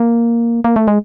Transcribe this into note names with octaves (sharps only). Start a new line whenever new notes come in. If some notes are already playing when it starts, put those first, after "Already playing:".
Already playing: A#3
A#3
A3
G#3